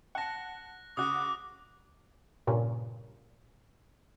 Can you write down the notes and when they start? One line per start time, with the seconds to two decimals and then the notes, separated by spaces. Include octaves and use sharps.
0.15 F#5 A5 F#6 A#6
0.97 C#3 F#4 D6 D#6 F#6
2.47 G2 A#2 C#3